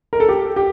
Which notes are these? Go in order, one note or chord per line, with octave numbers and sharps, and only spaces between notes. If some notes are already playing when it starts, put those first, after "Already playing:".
A#4
A4
G4
G4